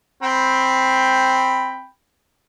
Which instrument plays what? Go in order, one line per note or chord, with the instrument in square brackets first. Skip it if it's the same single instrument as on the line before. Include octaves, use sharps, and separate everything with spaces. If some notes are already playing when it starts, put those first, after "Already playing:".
[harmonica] C4 G5 B5